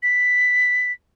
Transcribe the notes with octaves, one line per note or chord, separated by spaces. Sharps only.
B6